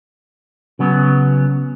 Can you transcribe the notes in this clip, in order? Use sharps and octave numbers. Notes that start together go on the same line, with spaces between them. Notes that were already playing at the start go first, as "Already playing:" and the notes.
C#3 F#3 B3